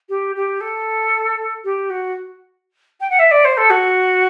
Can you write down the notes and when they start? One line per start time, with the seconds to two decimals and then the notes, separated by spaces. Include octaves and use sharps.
0.09 G4
0.35 G4
0.60 A4
1.64 G4
1.90 F#4
3.00 G5
3.09 F#5
3.19 E5
3.31 D5
3.45 C5
3.57 A4
3.70 F#4